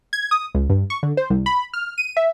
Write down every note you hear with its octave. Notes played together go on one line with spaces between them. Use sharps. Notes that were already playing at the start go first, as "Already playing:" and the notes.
G#6
D#6
C#2
G2
C#6
D3
C5
C2
B5
F6
D#7
E5